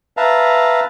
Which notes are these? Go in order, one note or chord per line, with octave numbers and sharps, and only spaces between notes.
B4 E5 F5 A5 A#5